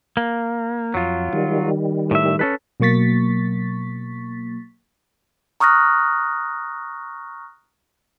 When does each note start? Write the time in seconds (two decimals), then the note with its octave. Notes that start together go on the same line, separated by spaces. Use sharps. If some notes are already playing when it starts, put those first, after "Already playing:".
0.17 A#3
0.94 F2 F#3 F4
1.33 D#3 G3
2.11 A2 E5
2.39 C#4 A4 B4
2.80 B2 F#3 A#3 C#6 A6 B6
5.60 A#5 C#6 D#6 F6 F#6 A#6